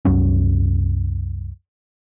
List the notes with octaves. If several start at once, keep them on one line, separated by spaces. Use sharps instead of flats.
C2 F#2 F#3 C#4